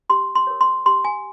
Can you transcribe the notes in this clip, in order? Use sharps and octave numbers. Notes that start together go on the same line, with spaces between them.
G4 C6
C6
A#4 C#5
C6
G4 C6
G#5